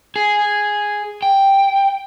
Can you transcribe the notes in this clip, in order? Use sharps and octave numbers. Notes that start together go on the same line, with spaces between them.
G#4
G5